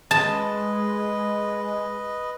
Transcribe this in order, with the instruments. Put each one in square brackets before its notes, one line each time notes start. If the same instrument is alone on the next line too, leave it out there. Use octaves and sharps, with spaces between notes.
[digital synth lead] G#3 [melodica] B4 D#5 [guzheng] A5